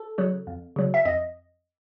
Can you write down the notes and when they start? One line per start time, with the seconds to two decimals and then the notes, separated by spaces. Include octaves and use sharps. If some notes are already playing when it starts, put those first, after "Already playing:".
Already playing: A4
0.18 C#3 F#3
0.47 F2
0.76 C#3 F#3
0.94 E5
1.05 F2 D#5